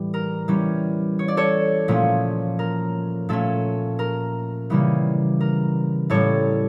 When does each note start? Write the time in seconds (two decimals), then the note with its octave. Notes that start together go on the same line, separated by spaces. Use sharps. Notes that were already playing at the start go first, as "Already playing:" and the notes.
Already playing: A2 E3 G3
0.14 A#4
0.48 E3 G3 C#4
1.19 C#5
1.28 D5
1.37 A4 C#5
1.88 A#2 F3 A3 C#4
2.59 A#4
3.29 A#2 A3 C#4 A4
3.99 A#4
4.70 C#3 E3 G3 A#3 C#4
5.40 A#4
6.10 A2 G3 A#3 C#4 A4 C#5